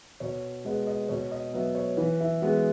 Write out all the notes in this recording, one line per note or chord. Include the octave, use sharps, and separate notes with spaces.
B2 C#5
G#3 B3 D#5
D#5
B2 C#5
D#5
F#3 B3 E5
C#5
E3 B4
E4
G#3 B3 F#4